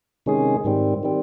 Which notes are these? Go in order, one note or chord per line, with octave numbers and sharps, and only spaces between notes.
C3 D#3 G#3 C#4 G#4
G#2 D#3 G3 C4
D#3 G3 C4